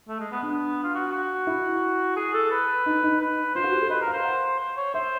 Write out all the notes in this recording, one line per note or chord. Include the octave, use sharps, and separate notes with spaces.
A3
G#3
B3
B3 D4
F4
F#4
F#4
E4
G#4
A4
B4
D#4
D#4
B4
F4 C5
F#4
G4
A4
B4 D#5
A#4
F5
C5
F#5
C5
C#5
C5 E5